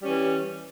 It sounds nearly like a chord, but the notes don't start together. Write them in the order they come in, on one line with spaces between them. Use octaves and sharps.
G3 C#4 E3